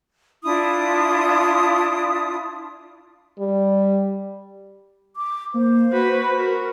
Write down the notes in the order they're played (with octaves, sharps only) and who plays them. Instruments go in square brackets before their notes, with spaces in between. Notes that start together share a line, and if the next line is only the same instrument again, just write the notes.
[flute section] D4 E4 F4 D#6
[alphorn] G3
[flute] D6
[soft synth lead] A#3 [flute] C5
[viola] F#4 B4 [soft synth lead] B6
[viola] F#4 A#4